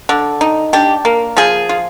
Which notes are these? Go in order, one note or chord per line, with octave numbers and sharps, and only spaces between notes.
D3
D#4
D4 G4
A#3
F3 G#4
F4